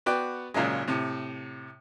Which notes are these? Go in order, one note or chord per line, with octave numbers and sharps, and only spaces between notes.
B3 F#4 D5 G5
G#1 A#2 C#3 F#3 G#3
A2 C3